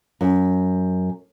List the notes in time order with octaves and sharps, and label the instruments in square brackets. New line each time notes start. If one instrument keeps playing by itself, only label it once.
[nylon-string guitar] F#2